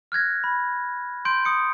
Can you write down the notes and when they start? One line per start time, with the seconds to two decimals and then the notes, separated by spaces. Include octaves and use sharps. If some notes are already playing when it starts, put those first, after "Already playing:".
0.12 F6 F#6 G#6 A#6
0.44 B5
1.25 C6 G6 D7
1.45 D#6 C#7